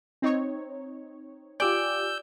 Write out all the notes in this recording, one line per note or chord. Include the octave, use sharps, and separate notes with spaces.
C4 D#4 C#5
F4 G4 D5 G#5 E6 G6